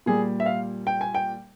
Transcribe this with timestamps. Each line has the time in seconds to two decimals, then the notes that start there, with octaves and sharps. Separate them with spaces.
0.06 A#2 G3 G#4
0.40 E5
0.46 F5
0.87 G5
1.01 G#5
1.15 G5